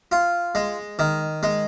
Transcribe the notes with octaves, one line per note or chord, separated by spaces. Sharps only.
F4
G#3
D#3
G#3